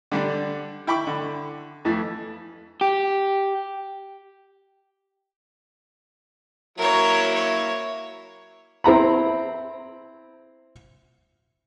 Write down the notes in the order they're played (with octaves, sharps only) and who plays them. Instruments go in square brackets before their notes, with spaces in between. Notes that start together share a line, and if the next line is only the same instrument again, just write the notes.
[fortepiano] D3 G3 D4
E4 G5 B5 C#6 D6
D3
F2 E3 A3
[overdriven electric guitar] G4
[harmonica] F#3 A#3 E4 [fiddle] A#4 C#5
[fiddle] C#5
[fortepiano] C4 E4 A#5 B5